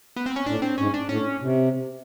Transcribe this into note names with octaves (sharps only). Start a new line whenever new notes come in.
B3
C4
C#4
A2 D4
C4
G#2 C#4
D4
A2 C#4
C3